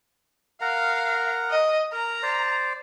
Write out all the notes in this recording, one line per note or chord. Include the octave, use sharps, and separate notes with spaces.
A#4 F5 F#5 A#5
D#5
A#4 A#5
C5 D5